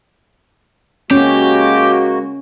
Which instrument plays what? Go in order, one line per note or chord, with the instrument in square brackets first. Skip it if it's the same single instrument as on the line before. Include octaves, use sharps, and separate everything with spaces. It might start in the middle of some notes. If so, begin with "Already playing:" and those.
[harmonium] G#3 A#3 F#4 [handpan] C#4 [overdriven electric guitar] G4